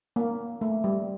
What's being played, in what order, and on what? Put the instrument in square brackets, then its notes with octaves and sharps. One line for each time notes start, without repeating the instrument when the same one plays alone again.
[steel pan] A#3
A3
G3